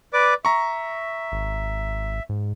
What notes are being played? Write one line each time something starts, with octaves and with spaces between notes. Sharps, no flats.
B4 D5 D6
E5 A#5 C#6
G#1
G#2